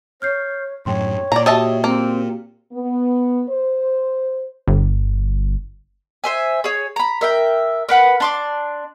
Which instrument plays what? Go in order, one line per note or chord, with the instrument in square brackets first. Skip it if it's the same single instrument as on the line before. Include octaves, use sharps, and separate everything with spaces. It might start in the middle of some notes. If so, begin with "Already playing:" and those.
[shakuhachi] C#5 [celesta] F6 G6 C7
[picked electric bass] F#2 A2 F#3 [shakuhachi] C#5 [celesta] G5 C6
[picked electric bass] A#2 [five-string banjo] D5 A#5
[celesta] F#4 G4 G5 [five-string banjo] D#5 E5 A5
[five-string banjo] A#3 [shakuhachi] C4
[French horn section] B3
C5
[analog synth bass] G1
[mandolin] C5 E5 G#5
G#4 C#5
A#5 B5
A#4 E5 G5
A#4 B4 F#5 B5
D4 C6 D6